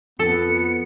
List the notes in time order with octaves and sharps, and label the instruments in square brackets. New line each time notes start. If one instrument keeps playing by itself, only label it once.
[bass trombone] F2 [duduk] B3 [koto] A4 [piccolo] C#7